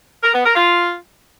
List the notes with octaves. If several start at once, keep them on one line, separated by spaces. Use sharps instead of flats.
A#4
B3
A#4
F4